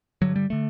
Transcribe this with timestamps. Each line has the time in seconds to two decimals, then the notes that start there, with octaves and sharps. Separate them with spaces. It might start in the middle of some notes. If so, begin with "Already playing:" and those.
0.22 G2 D3 F#3
0.36 G3
0.50 D3 A3